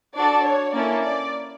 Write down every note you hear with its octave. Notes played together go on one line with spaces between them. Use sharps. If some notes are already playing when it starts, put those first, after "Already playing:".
D4 F#4 A4 D5
C#5
A#3 C#4 E4 A4 D5
D5